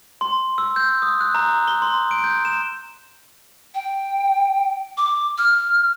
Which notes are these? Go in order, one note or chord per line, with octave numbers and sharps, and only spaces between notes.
C6
E6
G6
D#6
F#6
A#5
G7
C6
D7
G6
E7
G5
D6
F6